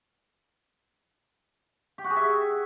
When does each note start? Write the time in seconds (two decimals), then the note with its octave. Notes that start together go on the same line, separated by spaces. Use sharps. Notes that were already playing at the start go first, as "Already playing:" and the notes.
1.98 G4
2.04 F#4
2.10 G#4
2.16 E5